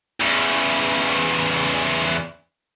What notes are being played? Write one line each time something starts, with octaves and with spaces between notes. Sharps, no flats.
E2 C#3